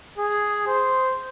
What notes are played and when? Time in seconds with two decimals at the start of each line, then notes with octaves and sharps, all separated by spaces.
0.18 G#4
0.68 C5